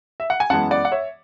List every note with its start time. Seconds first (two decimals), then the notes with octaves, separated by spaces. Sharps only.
0.20 E5
0.30 F#5
0.40 G#5
0.50 F#2 E3 G#3 B3 F#5 A5
0.71 D5 F#5
0.85 F#5
0.92 C#5 E5